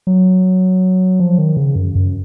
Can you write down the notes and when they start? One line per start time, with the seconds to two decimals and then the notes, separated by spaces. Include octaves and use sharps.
0.07 F#3
1.20 F3
1.38 D#3
1.57 C#3
1.75 F#2
1.95 F#2